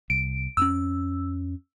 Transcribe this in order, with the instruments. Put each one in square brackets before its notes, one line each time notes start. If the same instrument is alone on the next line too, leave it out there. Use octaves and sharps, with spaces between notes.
[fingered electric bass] C2 [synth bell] D7
[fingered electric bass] F2 C4 C#4 [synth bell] E6